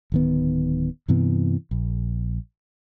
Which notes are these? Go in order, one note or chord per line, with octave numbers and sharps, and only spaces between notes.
D1 D#3 B3
G2 C3 E3 B3
A#1